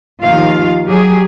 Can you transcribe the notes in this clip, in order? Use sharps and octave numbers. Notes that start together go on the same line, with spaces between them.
D#2 D#3 F3 F4 F5
F#3 G4 G#4